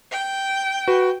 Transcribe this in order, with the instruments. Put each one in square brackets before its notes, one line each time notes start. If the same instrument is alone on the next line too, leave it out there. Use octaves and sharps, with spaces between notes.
[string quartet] G5
[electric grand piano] F#4 B4